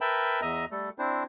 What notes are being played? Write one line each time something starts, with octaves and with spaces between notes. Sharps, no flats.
A#4 B4 E5 G5 A5 B5
E2 D#5 E5 A#5
G3 A3 A4
C4 D4 E4 C5